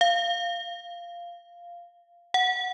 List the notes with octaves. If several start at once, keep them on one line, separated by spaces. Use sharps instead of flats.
F5
F#5